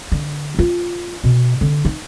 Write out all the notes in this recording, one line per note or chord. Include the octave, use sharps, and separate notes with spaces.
D3
F4
B2
D3
D#4